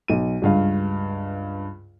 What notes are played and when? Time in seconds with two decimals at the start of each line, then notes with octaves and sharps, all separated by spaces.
0.08 B1 D#7
0.42 C#2 G2 F5